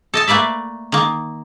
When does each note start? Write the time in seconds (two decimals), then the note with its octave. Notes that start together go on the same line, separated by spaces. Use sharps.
0.14 A4 D#5 A5
0.28 A3 A#3 B4 D5 E5
0.92 D#3 A#3